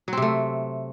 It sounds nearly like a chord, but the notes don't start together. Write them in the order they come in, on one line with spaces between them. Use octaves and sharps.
F#3 C4 C3 A3